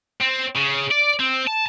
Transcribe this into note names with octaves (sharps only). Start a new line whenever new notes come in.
C4
C#3
D5
C4
A5